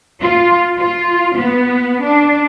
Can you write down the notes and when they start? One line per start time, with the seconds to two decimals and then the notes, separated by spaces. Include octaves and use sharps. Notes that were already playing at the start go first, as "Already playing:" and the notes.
0.20 F4
0.78 F4
1.36 B3
2.04 D4